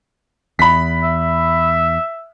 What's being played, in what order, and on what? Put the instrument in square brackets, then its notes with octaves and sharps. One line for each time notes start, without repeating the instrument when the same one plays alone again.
[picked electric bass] E2 [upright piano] B5 B6
[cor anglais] E5